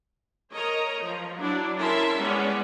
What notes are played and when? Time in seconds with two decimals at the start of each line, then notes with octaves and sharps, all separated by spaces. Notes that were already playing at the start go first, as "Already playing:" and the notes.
0.53 A#4 C#5 D#5 A#5
1.02 F3
1.37 F#3 D4 E4 D5
1.78 C#4 E4 A#4 E5 A5 C6
2.18 G3 G#3 B3 C#4 D5 F#5